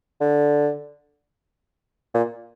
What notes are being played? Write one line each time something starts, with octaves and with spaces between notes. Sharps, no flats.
D3
A#2